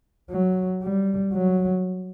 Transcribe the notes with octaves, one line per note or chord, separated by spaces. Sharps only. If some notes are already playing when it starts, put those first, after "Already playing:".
F#3
G3
F#3